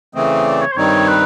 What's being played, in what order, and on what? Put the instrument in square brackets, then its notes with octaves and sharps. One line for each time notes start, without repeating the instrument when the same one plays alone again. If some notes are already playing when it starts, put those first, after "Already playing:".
[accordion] C#3 E3 A3 C4 [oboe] D#5
[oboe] D5
C#5
C5
[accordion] G2 D#3 G3 C4 D#4 [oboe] C#5
[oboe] B4